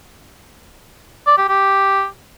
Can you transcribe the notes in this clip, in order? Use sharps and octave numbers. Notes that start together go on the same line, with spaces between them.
D5
G4
G4